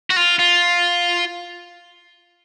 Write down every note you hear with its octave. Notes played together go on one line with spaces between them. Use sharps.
F#4
F4
F4